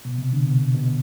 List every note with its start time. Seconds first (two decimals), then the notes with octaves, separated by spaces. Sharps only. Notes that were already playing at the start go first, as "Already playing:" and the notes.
0.05 B2
0.18 C3
0.33 D3
0.47 B2
0.75 B2